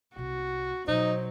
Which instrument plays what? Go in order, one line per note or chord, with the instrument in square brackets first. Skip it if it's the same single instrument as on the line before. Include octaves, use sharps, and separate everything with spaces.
[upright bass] C2 C3 [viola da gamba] F#4
[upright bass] B2 [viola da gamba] F#3 [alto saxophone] D#4 [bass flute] C5